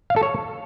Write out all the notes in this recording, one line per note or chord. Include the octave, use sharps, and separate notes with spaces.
F5
A4
C#5